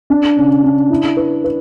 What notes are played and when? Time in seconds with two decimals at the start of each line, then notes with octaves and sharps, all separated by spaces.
0.10 D4
0.37 C#3
0.63 D4
0.90 E4
1.17 B4
1.44 B4